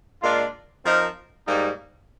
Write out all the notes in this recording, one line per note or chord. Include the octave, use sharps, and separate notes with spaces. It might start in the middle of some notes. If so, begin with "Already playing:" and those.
A#2 G#3 D4 F4
F3 C4 D#4 A#4
G#2 G3 A#3 D#4